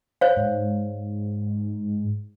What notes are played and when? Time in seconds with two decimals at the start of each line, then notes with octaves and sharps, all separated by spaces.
0.21 C5 C#5 F5
0.36 G#2